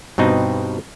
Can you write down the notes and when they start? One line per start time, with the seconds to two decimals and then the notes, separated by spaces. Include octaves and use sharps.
0.18 G2 B2 C4 D#4